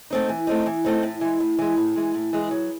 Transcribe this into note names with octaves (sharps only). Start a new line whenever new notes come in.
A3 C4 D#4
E3
A3 C4 D#4
E3
A3 C4 D#4
A2
E3 G#3
A2
E3 G#3
A2
E3 G#3
A2
E3 G#3
F#3